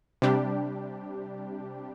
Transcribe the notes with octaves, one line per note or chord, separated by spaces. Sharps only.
C3 G3 D4 G4